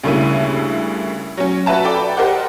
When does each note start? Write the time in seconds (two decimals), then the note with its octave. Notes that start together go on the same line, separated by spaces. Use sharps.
0.04 D2 G2 C#3 A#3 E4 D#7
1.37 F#3 C#4
1.66 F#4 B4 E5 A5 A#5
1.84 A4 D5 G5 B5 D6
2.17 G4 A#4 C5 D#5 F#5